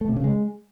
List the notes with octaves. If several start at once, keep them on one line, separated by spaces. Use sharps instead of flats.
A3
C3
C#3
G#3